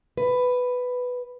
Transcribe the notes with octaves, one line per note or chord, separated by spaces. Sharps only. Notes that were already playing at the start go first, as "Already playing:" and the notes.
B4